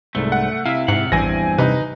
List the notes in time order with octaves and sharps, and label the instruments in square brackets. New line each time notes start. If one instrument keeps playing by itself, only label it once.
[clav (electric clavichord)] C2 G#2 [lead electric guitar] A3
[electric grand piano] F#5
[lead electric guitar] C3 [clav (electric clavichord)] E4 [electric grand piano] E5 F5
[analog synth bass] G#2 [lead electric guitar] C3 F#5
[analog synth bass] A1 [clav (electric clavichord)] E2 E3 [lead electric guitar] G2 C4 [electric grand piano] G#5 A#6
[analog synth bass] C3 [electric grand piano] D#4 B4